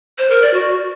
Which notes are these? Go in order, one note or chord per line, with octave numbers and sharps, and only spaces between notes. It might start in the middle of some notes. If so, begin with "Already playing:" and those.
C5
A#4
D5
F#4